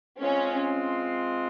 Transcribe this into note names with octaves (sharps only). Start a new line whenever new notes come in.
G#3 C4 C#4 F4